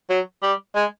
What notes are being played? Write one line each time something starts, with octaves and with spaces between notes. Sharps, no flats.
F#3
G3
G#3